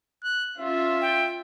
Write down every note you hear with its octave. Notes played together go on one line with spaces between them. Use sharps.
F#6
C#4 F4 E5
G5